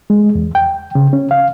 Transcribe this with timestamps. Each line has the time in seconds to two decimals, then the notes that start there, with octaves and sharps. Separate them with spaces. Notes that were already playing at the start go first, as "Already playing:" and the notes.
0.10 G#3
0.35 E2
0.55 G5
0.95 C#3
1.13 C#4
1.31 F5